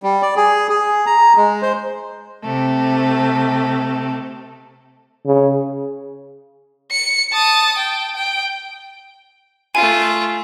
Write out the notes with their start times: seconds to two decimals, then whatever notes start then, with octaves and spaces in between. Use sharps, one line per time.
0.03 G3
0.22 D5
0.37 G#4
0.69 G#4
1.06 A#5
1.37 G#3
1.62 C5
2.45 C3 A3
5.26 C#3
6.91 C#7
7.32 A5 D#6
7.78 G5
8.15 G5
9.75 A3 F4 G#5